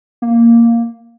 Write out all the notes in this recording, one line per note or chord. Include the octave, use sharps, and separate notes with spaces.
A#3